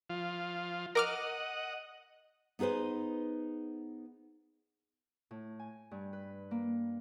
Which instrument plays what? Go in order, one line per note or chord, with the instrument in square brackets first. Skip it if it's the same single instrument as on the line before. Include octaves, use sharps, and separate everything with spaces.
[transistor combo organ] F3 F4
[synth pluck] A#4 D6 F6 [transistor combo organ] D#5 F#5
[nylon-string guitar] B3 D#4 G#4 B4 C5
[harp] A2
G#5
G2
B4
A#3